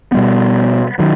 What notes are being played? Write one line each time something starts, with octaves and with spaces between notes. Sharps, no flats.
B2 G3 B3
D#3 F#3